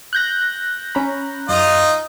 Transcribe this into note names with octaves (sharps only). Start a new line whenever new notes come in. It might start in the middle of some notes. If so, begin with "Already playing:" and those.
F#6 G6 A#6
C#4 A#5 B5
F#2 D#4 F4 D#5